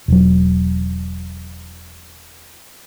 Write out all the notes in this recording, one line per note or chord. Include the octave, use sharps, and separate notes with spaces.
E1 F#3